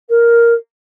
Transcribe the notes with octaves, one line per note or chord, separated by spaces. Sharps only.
A#4